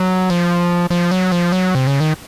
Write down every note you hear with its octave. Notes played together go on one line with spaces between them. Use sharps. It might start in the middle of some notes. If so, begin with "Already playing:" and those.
Already playing: F#3
F3
F3
F#3
F3
F#3
C3
C#3
D#3